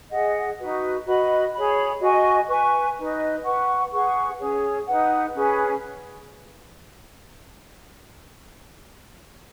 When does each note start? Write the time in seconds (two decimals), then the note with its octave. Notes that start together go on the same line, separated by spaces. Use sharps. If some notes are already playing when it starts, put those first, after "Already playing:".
0.10 G#4 D#5 F#5
0.58 D#4 F#4 B4
1.05 F#4 B4 D#5 B5
1.54 G#4 C#5 B5
2.00 F#4 D#5 G#5 C#6
2.48 B4 G#5 C#6
2.97 D#4 B4 D#5
3.44 B4 F#5 C#6
3.91 G#4 B4 F#5 C#6
4.39 C#4 G#4 C#5
4.87 D#4 B4 F#5
5.34 C#4 G#4 B4